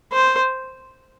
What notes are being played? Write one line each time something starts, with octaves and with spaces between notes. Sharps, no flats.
C5